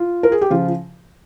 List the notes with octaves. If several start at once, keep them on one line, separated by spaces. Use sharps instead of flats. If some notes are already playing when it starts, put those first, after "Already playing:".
Already playing: F4
A#4
G#4
G4
C#3 F3 F4